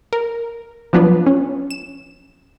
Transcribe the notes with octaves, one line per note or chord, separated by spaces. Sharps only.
A#4
F3 F#3 B3 D4 F4 B4
C#4
E7